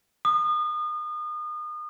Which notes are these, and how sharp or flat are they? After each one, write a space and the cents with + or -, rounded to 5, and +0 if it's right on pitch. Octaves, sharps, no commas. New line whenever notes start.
D#6 -35